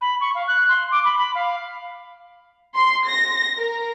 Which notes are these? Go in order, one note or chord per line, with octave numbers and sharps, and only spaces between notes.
B5
C#6
F5
F#6
C6
D6
B5
B5
F5
C6
A#6
A#4